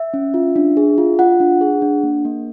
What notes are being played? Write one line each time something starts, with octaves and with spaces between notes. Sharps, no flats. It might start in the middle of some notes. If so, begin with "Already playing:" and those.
Already playing: E5
C#4
F4
D4
G#4
F4
F4 F#5
D4
G#4
D4
A#3
A#3